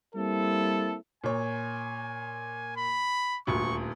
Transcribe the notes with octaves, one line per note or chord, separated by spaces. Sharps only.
G3 A#3 C4 E4 A4
A#2 C#5 G#5
B5
D#1 D2 C#6